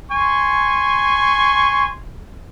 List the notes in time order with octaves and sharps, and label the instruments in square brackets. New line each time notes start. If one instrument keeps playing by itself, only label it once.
[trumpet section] G#5 C6 C#6